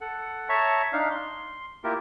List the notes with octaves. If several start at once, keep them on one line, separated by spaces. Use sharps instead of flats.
A4 F#5
C#5 E5 A5 A#5 C#6
D4 D#4 F5
C6
A#3 E4 F4 G4 A#4